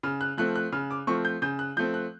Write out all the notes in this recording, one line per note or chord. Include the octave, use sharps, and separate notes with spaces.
C#3 F6
F#6
F3 A3 C4 F#6
F#6
C#3 F6
D6
F3 A3 C4 C#6
G6
C#3 G6
F#6
F3 A3 C4 G6
F#6